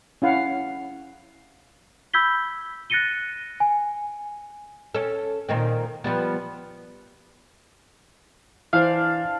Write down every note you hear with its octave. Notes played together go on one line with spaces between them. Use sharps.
C#4 E4 F5 F#5
B5 E6 G6 G#6 B6 G7
F#6 A6 A#6 C#7 D#7 G7
G#5
C#4 A4
A#2 D#3 C4
F3 G3 B3
E3 D4 C5 F5